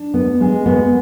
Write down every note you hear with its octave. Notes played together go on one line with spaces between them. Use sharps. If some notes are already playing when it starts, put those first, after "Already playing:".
Already playing: D4
B3
G#3
B3